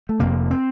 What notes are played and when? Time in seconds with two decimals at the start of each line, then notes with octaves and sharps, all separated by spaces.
0.09 A3
0.19 F1 F2 C3 A#3
0.51 C4